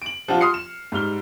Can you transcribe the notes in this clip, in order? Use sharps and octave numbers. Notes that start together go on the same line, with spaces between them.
D7 F#7
F3 G3 D4 F4 F#4
C6 D#6 F6 C7 C#7
E7
G#2 G3 F6 G7